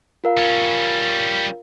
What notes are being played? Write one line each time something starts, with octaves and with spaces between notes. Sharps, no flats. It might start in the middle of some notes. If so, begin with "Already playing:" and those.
F4 A#4 F5
G3 C#4